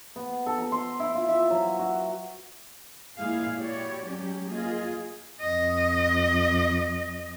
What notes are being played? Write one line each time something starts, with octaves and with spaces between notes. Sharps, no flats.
B3
A4
A#5
C6
E4
F4
E5
F#3
F#4
A#2 G#3 E4 G#4 F5
E4 F#4 G4 C#5 D5
F#3 G#3 C#4 G4
A#3 F4 G#4 D#5
F2 D#5